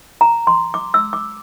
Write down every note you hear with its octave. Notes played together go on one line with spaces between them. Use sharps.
A#5
C6
D6
E6
D6